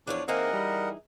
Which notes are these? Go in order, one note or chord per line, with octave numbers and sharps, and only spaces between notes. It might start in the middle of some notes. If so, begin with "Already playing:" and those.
E2 F3 D4 F4 C#5
E3 A#3 C4 D#4 G#4 A#4 D#5 F#5
G3